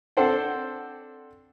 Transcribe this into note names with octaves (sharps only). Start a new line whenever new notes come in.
C4 D4 A4 C5 F#5 G5